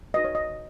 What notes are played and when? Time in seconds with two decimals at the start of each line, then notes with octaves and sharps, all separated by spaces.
0.14 D#4 F#4 B4 D#5
0.24 C#5
0.35 D#5